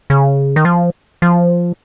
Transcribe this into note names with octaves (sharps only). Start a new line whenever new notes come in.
C#3
D#3
F3
F3